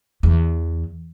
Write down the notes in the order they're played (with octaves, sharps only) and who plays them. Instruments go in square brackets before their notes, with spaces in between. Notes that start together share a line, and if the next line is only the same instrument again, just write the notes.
[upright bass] E2